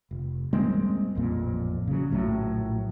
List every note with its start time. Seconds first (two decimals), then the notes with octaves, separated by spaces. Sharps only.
0.11 F1
0.53 G3 G#3 A#3 C4
1.15 A1 F2 A#2
1.87 C#3 F#3
2.11 A#1 A2 D3 F#3